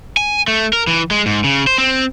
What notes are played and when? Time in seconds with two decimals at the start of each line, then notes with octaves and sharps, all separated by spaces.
0.17 G#5
0.48 A3
0.73 A#4
0.87 E3
1.11 G#3
1.26 G#2
1.44 C#3
1.67 C5
1.78 C4